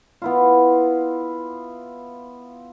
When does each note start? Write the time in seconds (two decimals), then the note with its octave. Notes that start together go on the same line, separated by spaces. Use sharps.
0.22 B3 E4 F4